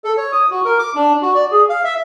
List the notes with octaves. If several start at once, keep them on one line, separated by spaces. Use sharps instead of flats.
A4
C#5
D#6
F#4
A#4
D6
D4
F#4
D5
G#4
F5
E5